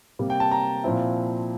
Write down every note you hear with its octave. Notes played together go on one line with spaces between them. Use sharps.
C3 G3 A#3
G5
A5
A#5
A#2 F3 C4 E4